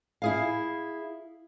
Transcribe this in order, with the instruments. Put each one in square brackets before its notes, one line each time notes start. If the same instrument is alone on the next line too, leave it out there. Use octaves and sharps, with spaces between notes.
[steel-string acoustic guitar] E4 G#4 F5